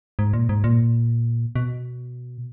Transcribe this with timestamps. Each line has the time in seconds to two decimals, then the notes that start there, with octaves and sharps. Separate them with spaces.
0.19 G#2
0.33 A#2
0.49 G#2
0.64 A#2
1.56 B2